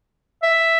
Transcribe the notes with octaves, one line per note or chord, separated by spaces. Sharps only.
E5